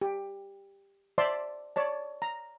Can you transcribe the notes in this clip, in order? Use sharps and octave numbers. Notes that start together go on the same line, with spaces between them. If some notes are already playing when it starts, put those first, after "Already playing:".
G4
C5 D5 E5 A5 C6
C#5 D5 A5
A#5